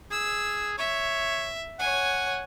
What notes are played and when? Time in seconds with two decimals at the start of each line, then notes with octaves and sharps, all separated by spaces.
0.11 G#4 E6
0.78 C#5 E5
1.79 C#5 F#5 G#5